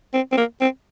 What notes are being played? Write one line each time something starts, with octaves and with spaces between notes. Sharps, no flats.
C4
C4
A#3
C4